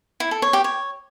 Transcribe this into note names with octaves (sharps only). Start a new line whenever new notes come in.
E4
A4
C#5
G4
C#5